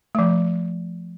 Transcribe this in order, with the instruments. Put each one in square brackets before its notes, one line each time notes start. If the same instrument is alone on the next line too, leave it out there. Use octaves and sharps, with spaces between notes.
[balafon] F3 A3